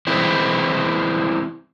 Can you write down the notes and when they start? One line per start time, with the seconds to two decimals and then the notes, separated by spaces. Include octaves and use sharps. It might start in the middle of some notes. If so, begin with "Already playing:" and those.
0.07 E3 G#3 C4 E4